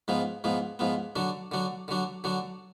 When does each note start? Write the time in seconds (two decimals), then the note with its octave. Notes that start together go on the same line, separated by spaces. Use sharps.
0.08 G#2 F3 B3
0.44 G#2 F3 B3
0.79 G#2 F3 B3
1.16 D3 F#3 D4
1.51 D3 F#3 D4
1.88 D3 F#3 D4
2.24 D3 F#3 D4